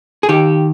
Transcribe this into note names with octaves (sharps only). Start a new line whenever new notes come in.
G#4
D#3 G4